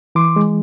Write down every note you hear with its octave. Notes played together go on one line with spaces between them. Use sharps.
E3 C6 D6
G#3